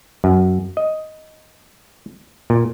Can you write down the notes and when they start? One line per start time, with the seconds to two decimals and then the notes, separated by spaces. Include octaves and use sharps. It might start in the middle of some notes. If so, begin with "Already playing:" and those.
0.24 F#2
0.77 D#5
2.50 A#2